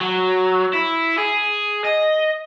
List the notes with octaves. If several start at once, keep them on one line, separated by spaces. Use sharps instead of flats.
F#3
E4
G#4
D#5